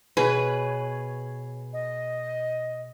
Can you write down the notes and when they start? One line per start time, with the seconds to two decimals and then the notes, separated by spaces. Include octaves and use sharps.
0.17 B2 G#4 B4 C#5
1.73 D#5